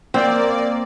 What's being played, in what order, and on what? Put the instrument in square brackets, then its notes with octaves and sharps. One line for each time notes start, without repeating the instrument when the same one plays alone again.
[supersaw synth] A#3 D5 [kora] C4